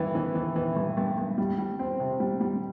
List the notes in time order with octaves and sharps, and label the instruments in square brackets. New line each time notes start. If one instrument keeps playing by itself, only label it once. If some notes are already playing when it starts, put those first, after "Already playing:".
Already playing: [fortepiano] G2 E3
E3
E3
E3
G2
G2
G2
G3
G3
C4
C3
G3
G3